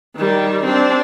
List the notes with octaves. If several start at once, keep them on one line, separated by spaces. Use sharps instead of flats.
D#3 G3
C4 D4